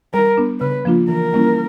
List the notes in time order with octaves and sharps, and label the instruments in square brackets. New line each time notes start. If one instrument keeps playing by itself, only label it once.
[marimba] G3 [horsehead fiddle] A#4
[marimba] B3 D4
[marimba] C#3 [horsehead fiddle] B4
[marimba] F3 A#3 D4 F4
[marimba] E3 [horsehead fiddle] A#4
[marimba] G3 A#3 C#4 E4